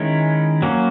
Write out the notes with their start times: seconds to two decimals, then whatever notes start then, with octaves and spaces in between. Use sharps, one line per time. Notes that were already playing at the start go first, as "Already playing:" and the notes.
Already playing: D#3 G#3 C#4 E4
0.62 F#3 A#3 C#4